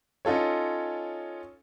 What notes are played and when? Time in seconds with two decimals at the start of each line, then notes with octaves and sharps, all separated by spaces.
0.25 C#4 D#4 F4 A4 C#5